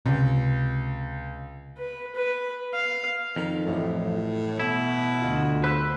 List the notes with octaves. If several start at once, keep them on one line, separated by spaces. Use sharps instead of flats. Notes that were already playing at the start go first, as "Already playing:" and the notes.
C#2 C3
B4
B4
F5
F2 D#3 F7
A1 F#2 A2
B2 E4
D2 F4 D#5 F#5
B4 C5 E6 F#6